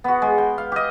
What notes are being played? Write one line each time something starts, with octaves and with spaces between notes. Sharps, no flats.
B3 F#4
G#3
G5
F5
G4 D#5